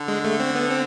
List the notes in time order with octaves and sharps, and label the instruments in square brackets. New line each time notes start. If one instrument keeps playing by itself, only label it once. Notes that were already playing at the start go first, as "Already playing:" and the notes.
Already playing: [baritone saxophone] D3
[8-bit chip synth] G#3
A3
C4
B3
C4